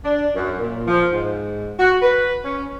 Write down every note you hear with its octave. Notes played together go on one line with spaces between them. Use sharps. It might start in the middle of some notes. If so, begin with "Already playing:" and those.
D4
F#2
A#2
F3
G#2
F#4
B4
C#4